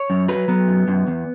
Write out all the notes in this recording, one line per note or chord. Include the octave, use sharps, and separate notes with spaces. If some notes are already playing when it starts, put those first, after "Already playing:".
Already playing: C#5
F#2
F#3 B4
F#3 B3
F#2
F#2
E2